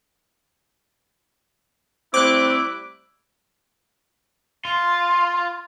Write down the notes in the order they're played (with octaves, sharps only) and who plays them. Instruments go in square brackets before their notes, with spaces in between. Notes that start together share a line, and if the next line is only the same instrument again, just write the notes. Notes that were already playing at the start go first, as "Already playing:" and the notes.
[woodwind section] G3 A3 E4 [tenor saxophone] C4 [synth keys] D6 F#6
[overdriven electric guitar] F4 [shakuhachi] C6